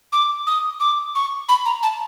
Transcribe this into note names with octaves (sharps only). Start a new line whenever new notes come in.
D6
D#6
D6
C#6
B5
A#5
A5